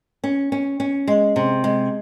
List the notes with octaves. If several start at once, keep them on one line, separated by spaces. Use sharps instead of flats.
C#4
C#4
C#4
G#3
C3
G#3